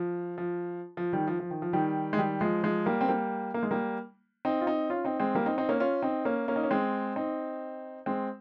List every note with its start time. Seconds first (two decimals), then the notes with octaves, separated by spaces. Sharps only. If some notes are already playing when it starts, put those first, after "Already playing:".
Already playing: F3
0.38 F3
0.97 F3
1.13 D#3 G3
1.28 F3
1.40 F3
1.51 D#3
1.62 F3
1.73 D#3 G3
2.13 G#3
2.18 D#3 G3
2.41 F3 G#3
2.63 F3 G#3
2.86 G3 A#3
3.01 C4
3.09 G3 A#3
3.54 A#3
3.63 G#3
3.71 G3 A#3
4.45 C4 D#4
4.61 F4
4.67 C4 D#4
4.90 C#4 F4
5.05 C4 D#4
5.20 G#3 C4
5.35 G3 A#3
5.46 C4 D#4
5.58 C4 D#4
5.69 A#3 C#4
5.80 C#4 F4
6.03 C4 D#4
6.25 A#3 C#4
6.48 A#3 C#4
6.56 D#4
6.63 C#4
6.71 G#3 C4
7.16 C4 D#4
8.06 G#3 C4